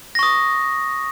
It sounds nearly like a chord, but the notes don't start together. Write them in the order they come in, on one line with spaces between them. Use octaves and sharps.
A#6 C#6 D#6